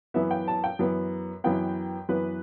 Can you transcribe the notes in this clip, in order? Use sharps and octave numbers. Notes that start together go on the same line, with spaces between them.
F#2 E3 B3 E5
G5
A5
G5
F#2 E3 B3
F#2 E3 B3 G5
F#2 E3 B3 B4